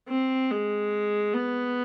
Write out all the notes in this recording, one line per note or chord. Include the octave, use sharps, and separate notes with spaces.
C4
G#3
B3